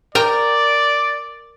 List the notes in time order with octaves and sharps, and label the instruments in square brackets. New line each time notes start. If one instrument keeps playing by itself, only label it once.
[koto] A#4 G5 A#5 [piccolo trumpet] D5